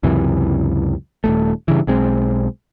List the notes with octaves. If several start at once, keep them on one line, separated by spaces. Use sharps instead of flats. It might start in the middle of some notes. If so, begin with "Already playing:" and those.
C#2 F#2 C3 E3
D#1 D#2 A3
G2 C#3 E3
B1 G#3 C4